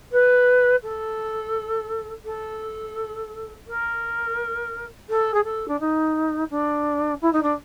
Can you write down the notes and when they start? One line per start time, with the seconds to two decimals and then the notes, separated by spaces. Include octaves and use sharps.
0.12 B4
0.83 A4
2.25 A4
3.67 A#4
5.09 A4
5.34 G#4
5.43 A4
5.67 D4
5.80 D#4
6.50 D4
7.21 E4
7.32 D#4
7.42 D4